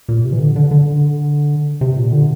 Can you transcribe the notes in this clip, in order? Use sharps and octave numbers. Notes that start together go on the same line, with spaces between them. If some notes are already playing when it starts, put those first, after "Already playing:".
A#2
C3
E3
D3
D3
D3
C3
A#2
D3